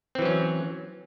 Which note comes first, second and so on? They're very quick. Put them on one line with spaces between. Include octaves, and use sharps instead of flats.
C4 E3 F#3 C#4